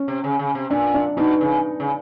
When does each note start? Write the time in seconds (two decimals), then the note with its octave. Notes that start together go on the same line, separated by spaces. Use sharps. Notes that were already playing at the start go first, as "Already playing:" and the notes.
Already playing: C#4
0.08 C3
0.24 C#3
0.39 C#3
0.55 C3
0.70 A#2 D4
0.94 D4
1.17 B2 D#4
1.41 C#3
1.80 C#3